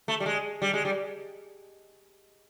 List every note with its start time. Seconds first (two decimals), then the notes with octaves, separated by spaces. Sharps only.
0.08 A3
0.20 G3
0.26 G#3
0.62 G3
0.73 G#3
0.85 G3